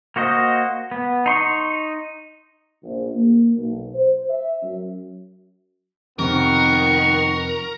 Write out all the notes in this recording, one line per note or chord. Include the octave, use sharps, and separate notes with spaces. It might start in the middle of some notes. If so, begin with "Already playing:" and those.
A#3 F#4 C5 D#5
B3
D#4 C6 C#6
A#1
A#3
B1
C5
E5
F#2
F2 C3 D#3 B3 A#4 C#6